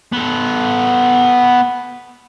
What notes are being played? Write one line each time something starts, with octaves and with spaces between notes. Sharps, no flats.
B3 A4